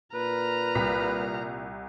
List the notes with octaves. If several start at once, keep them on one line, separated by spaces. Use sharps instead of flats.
A#2 B4 A#5 F6
C2 B6 F7